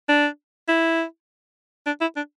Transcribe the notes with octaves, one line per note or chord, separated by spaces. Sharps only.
D4
E4
D4
E4
D4